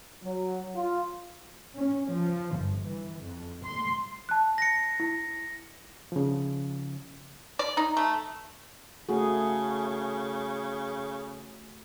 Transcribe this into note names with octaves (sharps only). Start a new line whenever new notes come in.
F#3
F4
C#4
F3
G1
E3
F2
C6
A5 F#6
A#6 C#7
E4
C#3 F3
D5
D#4
A3
C#3 A3 F#4 G#4